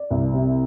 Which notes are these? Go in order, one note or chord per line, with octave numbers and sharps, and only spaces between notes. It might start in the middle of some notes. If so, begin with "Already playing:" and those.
Already playing: D5
C2
C3